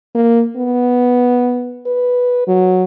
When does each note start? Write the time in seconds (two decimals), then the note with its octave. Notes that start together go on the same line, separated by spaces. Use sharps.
0.15 A#3
0.57 B3
1.86 B4
2.47 F#3